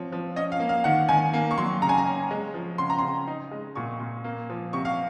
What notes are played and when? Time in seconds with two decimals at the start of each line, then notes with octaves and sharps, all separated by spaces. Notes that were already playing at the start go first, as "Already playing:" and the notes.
Already playing: F3 C4 C#5
0.12 F3
0.36 C#4 D#5
0.52 F5
0.60 A#3
0.69 F5
0.84 D#3 F#5
1.09 D#3 G#5
1.33 A#3
1.51 C#6
1.58 F#3 C6
1.81 C#3 A#5
1.89 G#5
1.98 A#5
2.07 C#4
2.31 G#3
2.54 F3
2.78 C#3 C6
2.90 A#5
2.99 C#3 C6
3.27 D#4
3.51 G#3
3.76 A#2 C#6
4.00 A#2
4.24 A#3
4.50 F3
4.73 C3 C#6
4.85 F5